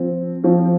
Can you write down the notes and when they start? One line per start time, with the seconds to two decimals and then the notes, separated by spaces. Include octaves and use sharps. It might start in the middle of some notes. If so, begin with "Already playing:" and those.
Already playing: F3 C4
0.44 F3 C4